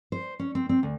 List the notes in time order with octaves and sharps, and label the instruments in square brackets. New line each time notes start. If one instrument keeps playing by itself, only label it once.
[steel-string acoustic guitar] C5
C#4
C4
C4
D2